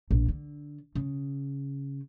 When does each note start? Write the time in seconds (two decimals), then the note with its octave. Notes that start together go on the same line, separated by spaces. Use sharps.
0.11 A#1
0.28 D3
0.95 C#3